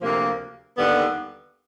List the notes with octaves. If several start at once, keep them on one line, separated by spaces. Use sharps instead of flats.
D2 C3 F3 A#3
D#2 D3 G3 B3